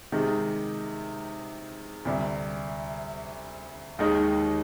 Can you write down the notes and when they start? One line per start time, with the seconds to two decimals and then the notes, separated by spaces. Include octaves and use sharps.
0.12 C3 D#3 G#3 D#4
2.05 D2 C3 G3
3.99 D#2 D#3 G#3 D#4